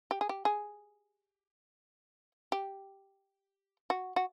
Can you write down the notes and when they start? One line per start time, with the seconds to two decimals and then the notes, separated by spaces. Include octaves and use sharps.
0.11 G4
0.21 G#4
0.29 G4
0.45 G#4
2.52 G4
3.90 F#4
4.16 F#4